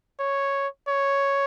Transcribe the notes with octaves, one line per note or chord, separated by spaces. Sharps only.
C#5
C#5